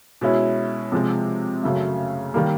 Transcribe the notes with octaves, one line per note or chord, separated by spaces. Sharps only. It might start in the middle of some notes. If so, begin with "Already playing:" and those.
B2 G#3 C#4 E4
C3 F3 G#3
F#2 C#3 F#3 A3
D#3 G3 A#3